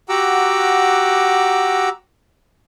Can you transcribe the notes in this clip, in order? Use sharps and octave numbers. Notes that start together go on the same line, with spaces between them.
F#4 G4 F#5 A#5 D6 E6